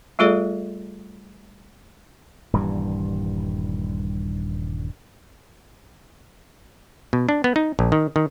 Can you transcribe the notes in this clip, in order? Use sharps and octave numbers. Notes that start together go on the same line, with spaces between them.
G3 A3 F4 G#4 A4 D5
D#1 G2 E3 G3
B2
D4
B3
D#4
A#1
D#3
D#3